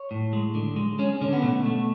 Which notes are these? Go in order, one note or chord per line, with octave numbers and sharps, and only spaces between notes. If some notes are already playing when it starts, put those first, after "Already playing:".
Already playing: C#5
A2
G#3
D3
G#3
G#3 C#4
D3 C#4
B3
B2 A3
A3